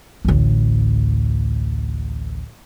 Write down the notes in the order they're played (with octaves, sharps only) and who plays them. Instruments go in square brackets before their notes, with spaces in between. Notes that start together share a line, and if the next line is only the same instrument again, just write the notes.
[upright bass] A1 D2